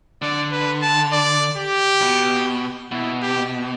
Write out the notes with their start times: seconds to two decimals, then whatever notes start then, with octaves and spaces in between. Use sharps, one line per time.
0.22 D3 D5
0.52 B4
0.82 A5
1.12 D5
1.57 G4
2.02 B2
2.92 B2 E4
3.22 G4